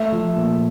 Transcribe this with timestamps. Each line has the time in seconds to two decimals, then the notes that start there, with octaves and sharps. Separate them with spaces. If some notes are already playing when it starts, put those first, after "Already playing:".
Already playing: A3 E5
0.12 F3
0.36 A#2